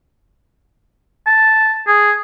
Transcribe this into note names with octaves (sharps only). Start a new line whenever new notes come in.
A5
G#4